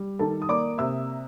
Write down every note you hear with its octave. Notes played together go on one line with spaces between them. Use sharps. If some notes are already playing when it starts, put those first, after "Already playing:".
Already playing: G3
D#3 A4 A5
D#6
A#3 D5 D6
C3 E5 E6